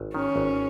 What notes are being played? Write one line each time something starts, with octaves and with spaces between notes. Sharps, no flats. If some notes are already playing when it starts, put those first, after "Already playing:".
Already playing: G#1
D#3 C#4
G#1